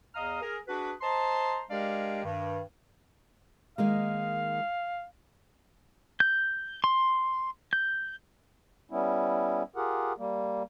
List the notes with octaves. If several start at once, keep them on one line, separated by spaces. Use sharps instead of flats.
E2 D#5 F5 A#5 D#6 F6
G#4 A#4
D4 F#4 G#4 B4
C5 D#5 A5 A#5 C6
G#3 D4 G4 A#4 D5 F5
G2 D#3
D#3 G#3 A#3 F5
G6
C6
G6
G3 B3 C#4 E4
F4 G4 G#4 A#4 F#5
G3 A#3